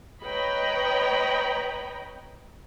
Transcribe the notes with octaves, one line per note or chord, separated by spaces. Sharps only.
B4 C#5 D#5 G5 A#5 B5